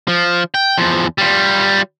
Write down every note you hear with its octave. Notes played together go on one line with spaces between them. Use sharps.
F3
G5
E2 F3
G3 F4